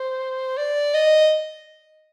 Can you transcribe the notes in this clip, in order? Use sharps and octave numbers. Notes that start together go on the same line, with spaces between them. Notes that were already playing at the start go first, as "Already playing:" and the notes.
Already playing: C5
D5
D#5